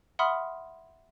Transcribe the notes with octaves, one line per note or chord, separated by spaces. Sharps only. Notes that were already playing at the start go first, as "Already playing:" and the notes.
E5 F#5 B5 C6 D#6 F6